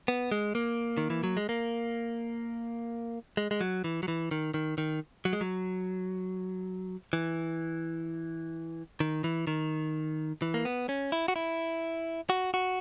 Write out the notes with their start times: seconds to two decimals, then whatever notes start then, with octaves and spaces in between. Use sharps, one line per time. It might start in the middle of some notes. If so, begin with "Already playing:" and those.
0.08 B3
0.32 G#3
0.55 A#3
0.97 D#3
1.10 E3
1.24 F#3
1.37 G#3
1.49 A#3
3.37 G#3
3.51 G#3
3.61 F#3
3.84 E3
4.03 F#3
4.08 E3
4.31 D#3
4.54 D#3
4.78 D#3
5.25 F#3
5.33 G#3
5.41 F#3
7.13 E3
9.00 D#3
9.24 E3
9.47 D#3
10.42 E3
10.54 A#3
10.65 B3
10.89 C#4
11.12 E4
11.28 F#4
11.36 E4
12.30 F#4
12.54 F#4